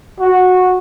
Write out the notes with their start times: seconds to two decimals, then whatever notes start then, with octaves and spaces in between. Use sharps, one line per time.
0.20 F#4